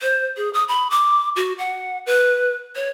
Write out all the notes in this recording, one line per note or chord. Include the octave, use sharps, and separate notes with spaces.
C5
G#4
D#6
B5
D6
F#4
F#5
B4
C#5